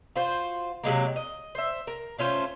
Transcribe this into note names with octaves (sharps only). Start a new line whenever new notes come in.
F4 F#4 C5
C3 F#3 G#3 A#3
D#5
C5 E5
A#4
A3 C#4 F4 C5